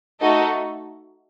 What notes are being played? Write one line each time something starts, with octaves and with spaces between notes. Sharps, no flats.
A3 D#4 F#4 A4 D#5